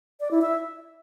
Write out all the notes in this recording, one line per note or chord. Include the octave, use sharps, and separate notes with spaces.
D5
E4
E5